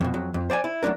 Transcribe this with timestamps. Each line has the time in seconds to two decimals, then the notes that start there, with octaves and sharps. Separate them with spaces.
0.01 F2 B2
0.14 F2 F#3
0.34 F2
0.50 C5 D5 F#5 G#5
0.64 E4
0.83 F#3 A3 A#3 D4 A#4